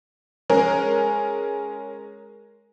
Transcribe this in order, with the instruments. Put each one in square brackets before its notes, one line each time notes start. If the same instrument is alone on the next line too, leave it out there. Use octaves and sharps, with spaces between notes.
[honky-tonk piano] G#3 C#4 G#4 A#4